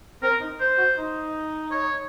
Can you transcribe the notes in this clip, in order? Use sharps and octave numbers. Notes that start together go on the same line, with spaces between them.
C4 A#4
D#4
C5
F#4
D#4
C#5